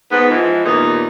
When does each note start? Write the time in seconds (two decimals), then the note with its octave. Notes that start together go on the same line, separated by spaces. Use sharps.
0.12 G#2 B3
0.30 E3 F3 G#3
0.65 D#2 A#2 E3 B3 D#4